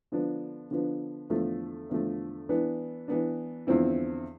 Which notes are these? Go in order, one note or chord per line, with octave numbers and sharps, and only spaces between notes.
D3 F3 B3 D4
D3 F3 B3 D4
E2 D3 F3 A3
E2 D3 F3 A3
E3 B3 D4
E3 B3 D4
E2 D3 F3 C4 E4